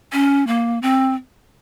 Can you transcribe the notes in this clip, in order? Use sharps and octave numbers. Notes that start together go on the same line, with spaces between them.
C#4
A#3
C4